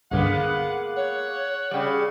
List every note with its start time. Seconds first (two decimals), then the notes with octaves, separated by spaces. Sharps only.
0.11 C2 G2 D3 G#3 A#3 B3 F#5
0.96 C#5 F#5
1.71 C#3 G3 D5 G5